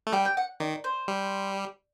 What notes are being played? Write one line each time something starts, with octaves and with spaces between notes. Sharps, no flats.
A3
G3 G5
G5
F#5
D#3 D5
C5
G3